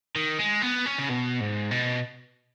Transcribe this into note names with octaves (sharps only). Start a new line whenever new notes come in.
D#3
G#3
B3
C#4
C#3
B2
G#2
B2